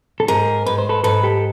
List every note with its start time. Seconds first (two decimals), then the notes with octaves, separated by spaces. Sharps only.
0.20 A4
0.28 G#2 G#4 A#4
0.66 G#2 B4
0.78 C5
0.89 A4 B4
1.04 G#2 A4 B4
1.23 G4 A4